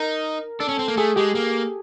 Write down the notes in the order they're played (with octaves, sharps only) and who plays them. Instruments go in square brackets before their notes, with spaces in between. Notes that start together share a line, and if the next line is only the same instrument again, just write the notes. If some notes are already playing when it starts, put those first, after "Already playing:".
Already playing: [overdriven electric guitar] D#4 [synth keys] A#4
[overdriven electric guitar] D4 [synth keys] A4
[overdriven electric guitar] C#4
C4
A#3
[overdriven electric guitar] A3 [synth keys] G#4
[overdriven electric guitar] G#3 [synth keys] G4
[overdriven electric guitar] A#3